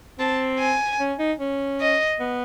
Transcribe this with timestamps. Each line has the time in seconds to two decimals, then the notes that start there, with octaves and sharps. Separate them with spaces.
0.19 C4 A5
0.59 G#5
1.00 C#4
1.19 D#4
1.39 C#4
1.80 D#5
2.20 B3